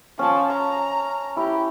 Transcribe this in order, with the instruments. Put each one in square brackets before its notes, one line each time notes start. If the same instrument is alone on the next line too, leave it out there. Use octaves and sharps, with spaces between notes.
[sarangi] F3 [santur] C#4 A5
[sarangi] A#5
[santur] E4 [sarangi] G4